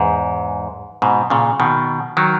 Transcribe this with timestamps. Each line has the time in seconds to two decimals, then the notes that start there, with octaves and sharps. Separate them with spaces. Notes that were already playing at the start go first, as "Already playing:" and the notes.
Already playing: E2 G#2
1.02 G#2 B2
1.30 A#2 C#3
1.60 B2 D#3
2.17 D#3 F#3